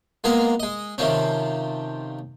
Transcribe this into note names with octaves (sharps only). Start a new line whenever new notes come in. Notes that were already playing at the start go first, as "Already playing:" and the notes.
G#3 A#3 B3 F4 G#4 A#4
G#3 D#5
C3 D#3 F3 C4 C#4